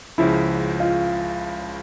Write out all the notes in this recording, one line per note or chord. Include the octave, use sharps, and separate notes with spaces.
C#2 C#3 F3 E4
F4